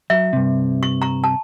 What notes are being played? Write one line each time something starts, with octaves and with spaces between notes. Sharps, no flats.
F#3 E5
G2 C3
C#6
A#5 C#6
A5